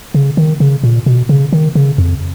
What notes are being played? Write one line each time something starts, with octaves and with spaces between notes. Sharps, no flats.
C#3
D#3
C#3
A#2
B2
C#3
D#3
C#3
F2